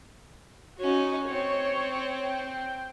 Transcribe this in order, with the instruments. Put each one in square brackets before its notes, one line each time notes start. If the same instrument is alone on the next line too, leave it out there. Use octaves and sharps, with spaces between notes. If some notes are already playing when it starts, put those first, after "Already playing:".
[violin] C#4 D#4 [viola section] F#4
[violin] C4 [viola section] C#5
[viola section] G5